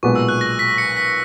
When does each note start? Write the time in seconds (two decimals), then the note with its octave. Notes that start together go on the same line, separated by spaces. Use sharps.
0.03 B1 A#2 G#3 B3 C#6
0.15 E6
0.29 F#6
0.41 A#6
0.59 B6
0.78 C#7
0.97 B6